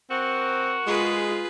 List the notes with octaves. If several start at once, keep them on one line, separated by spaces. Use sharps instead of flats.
C4 F#4 A#4
G#3 F4 G#4 B4